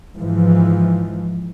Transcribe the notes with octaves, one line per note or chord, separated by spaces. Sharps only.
G#2 E3 F3